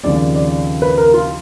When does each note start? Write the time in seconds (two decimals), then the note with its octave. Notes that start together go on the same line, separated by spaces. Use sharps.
0.04 D#2 C#3 F3 G#3 C4 D5
0.35 D5
0.82 B4
0.98 A#4
1.14 F4